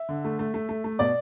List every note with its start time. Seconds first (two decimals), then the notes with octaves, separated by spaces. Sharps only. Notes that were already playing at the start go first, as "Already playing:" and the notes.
Already playing: E5
0.09 D3
0.25 A3
0.39 A3
0.54 A3
0.69 A3
0.84 A3
0.99 B2 D5